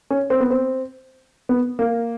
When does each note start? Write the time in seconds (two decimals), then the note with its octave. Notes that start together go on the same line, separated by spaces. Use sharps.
0.10 C#4
0.30 C4
0.40 B3
0.50 C4
1.49 B3
1.79 A#3